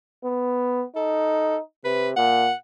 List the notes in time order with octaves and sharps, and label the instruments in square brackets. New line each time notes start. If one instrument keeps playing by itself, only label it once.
[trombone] B3
[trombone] D#4 [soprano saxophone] A4
[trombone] C3 [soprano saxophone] B4
[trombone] A#2 [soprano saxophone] F#5